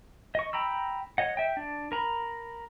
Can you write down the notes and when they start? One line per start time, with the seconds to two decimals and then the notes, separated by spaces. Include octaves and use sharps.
0.35 D#5 C#6
0.53 G5 A#5 B5 E6
1.18 C#5 D#5 F#5
1.37 E5 G5
1.57 D4
1.92 A#4 A#5 B5